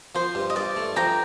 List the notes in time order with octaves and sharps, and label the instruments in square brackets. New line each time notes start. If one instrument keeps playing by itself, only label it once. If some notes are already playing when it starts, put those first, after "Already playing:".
[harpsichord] F3 [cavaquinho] C5
[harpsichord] G2
[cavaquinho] D#5
[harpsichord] G2 [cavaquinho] D5
[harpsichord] A3
[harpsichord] F3 [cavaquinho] G5 A#5